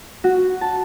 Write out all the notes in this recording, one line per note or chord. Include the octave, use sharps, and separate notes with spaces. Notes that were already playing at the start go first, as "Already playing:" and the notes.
F#4
A5